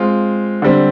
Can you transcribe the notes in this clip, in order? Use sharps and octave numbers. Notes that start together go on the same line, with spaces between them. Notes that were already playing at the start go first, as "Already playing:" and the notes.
Already playing: G#3 C4 F4
D3 G3 C4